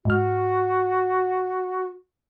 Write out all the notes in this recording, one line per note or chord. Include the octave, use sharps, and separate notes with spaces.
G#2 F#4 F6